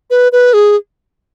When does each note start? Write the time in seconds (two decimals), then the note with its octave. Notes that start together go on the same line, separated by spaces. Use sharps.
0.10 B4
0.32 B4
0.54 G#4